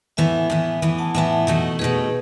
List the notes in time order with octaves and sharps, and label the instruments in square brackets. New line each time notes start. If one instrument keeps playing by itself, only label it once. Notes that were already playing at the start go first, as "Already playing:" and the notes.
[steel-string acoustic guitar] A2 E3 B3 [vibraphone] E5 G#5
[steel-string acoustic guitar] A2 E3 B3
A2 E3 B3
[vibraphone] F#5 A5
[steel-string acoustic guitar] A2 E3 B3 [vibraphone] E5 G#5
[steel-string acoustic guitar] B2 A3 D#4 F#4
[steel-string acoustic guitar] B2 A3 D#4 F#4 [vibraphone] G#4 B4